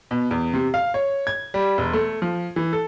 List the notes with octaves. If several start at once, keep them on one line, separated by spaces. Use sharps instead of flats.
B2
E2
C3
F5
C#5
G#6
G3
E1
A3
F3
E3
A4